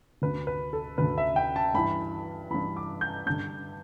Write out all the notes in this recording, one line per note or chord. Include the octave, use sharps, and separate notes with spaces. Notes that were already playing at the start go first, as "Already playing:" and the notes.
D2 D3 B4
B4
A4
D2 D3 B4
E5
G5
A5
G2 E3 B5
G2 E3 B5
D6
G6
G2 D3 G6